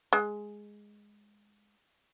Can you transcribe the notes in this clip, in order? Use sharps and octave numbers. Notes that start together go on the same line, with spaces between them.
G#3